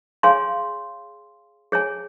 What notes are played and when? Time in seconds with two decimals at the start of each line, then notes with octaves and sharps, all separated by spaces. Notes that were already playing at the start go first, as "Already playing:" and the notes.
0.23 G#4 C#5 F5 G#5 C6
1.72 G#4 C#5 G#5